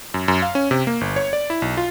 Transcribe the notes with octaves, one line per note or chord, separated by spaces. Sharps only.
F#2
F#2
F5
C#4
C3
A#3
G1
C#5
D5
E4
B1
F4